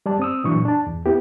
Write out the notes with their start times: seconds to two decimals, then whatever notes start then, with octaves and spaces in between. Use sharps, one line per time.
0.06 G3 D5 A5
0.19 C4 D#6 E6
0.44 A#2 E3 F#3 D4 C#6
0.65 D4 A5
0.87 E2
1.06 B3 E4 G4